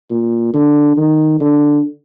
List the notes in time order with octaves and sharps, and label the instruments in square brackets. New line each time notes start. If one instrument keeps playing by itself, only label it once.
[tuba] A#2
D3
D#3
D3